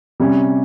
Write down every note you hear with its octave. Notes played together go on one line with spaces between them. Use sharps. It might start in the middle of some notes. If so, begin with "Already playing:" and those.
C3 G3 C#4